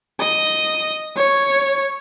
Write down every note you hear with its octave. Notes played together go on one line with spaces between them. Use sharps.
D#5
C#5